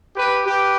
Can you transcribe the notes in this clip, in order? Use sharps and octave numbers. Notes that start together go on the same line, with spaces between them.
G4 B4
G4 B4